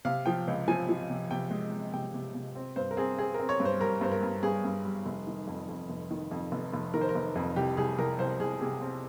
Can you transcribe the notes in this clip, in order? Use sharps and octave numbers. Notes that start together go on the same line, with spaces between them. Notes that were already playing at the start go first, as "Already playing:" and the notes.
C3 F5
F3 G5
C#2
F3 G#5
F3
C3
C3 G5
G#3
G#3
C3 G5
C3
C3
C4
G2 C5
A#4
C4 G#4
C4 G#4
C4 A#4
C#5
G2
C5
G3 A#4
G2 C5
A#4
G2
G2 G#4
G2
G3
F1
D#3
F2
F2
F1
D#3
F2
F1
F1
D#3 A#4
C5
A#4
F1
F2
C2 G4
C2 G#4
C2 A#4
C2 C5
C2 G#4
C3 G#4
C4